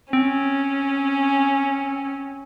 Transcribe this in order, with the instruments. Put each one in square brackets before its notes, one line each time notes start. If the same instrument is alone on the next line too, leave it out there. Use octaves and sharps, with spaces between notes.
[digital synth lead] C4 [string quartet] C#4